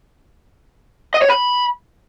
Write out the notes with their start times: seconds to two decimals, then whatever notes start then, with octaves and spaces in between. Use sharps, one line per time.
1.14 D#5
1.22 C#5
1.30 B5